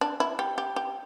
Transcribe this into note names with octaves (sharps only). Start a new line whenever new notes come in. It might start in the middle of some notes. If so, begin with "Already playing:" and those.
D4
E4
G4
G4
G4